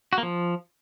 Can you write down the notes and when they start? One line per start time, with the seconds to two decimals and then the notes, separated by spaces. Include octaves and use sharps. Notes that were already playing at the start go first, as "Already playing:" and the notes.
0.13 F#4
0.18 A#3
0.23 F3